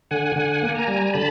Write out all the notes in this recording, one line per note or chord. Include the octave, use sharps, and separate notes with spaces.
D3 F#5 G#5
D3 F#5 G#5
A#3
G#5 A#5
G3
D3 A5 B5